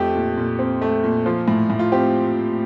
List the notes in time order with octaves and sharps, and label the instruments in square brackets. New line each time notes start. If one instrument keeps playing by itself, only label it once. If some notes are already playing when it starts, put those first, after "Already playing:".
Already playing: [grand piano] F2 A3 G4
A#2
A#2
C4
A3
A#2
F3 F4
A2
A2
F4
C4 G4